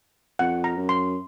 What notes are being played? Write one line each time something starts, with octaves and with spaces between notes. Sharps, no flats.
F2 F#5
A#5
F#2
C6